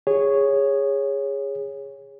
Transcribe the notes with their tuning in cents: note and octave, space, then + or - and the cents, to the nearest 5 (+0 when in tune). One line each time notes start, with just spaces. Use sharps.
G#4 -20 C#5 +0